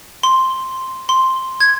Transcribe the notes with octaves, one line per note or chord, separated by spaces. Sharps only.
C6
C6
G#6